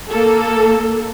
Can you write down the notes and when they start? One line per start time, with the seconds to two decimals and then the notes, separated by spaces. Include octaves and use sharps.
0.11 A#3 A4